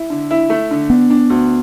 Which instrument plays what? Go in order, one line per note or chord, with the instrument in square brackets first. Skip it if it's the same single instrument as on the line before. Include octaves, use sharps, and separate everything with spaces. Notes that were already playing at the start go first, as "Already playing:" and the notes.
Already playing: [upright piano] E4
D3
E4
A3
D3
[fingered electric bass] B3 [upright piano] D4
[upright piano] D4
D2